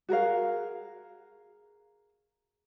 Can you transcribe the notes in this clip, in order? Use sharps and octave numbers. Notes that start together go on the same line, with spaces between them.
F#4 G#4 A#4 F5